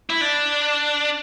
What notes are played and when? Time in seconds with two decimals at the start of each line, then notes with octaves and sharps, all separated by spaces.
0.10 E4
0.21 D4